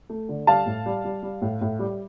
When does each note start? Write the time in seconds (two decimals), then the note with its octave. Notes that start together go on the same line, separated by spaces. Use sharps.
0.09 A3
0.29 D3
0.47 G3 F5 A5
0.66 A2
0.86 G3
1.05 G3
1.23 G3
1.42 A2
1.61 A2
1.79 G3